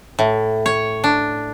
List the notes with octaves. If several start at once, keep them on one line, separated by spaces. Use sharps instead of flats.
A2
C#5
D4